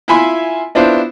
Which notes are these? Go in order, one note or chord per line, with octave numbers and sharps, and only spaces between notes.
E4 F4 E5 G#5 B5 C6
B3 D4 E4 F4 C5